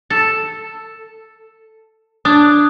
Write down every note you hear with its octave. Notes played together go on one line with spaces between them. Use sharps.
A4
D4 D#6 F#6 G#6